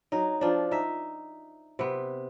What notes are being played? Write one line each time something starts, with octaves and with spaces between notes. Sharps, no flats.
F#3 D#4
F3 D4
D#4 E5
C3 B3